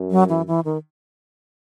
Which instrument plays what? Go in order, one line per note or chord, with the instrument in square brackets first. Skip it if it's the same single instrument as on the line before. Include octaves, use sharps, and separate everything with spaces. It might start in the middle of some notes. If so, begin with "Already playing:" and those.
Already playing: [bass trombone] F#2
[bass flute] F#3
E3
E3
D#3